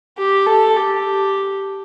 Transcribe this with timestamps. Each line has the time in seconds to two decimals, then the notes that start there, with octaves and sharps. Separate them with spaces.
0.18 G4
0.47 A4
0.76 G4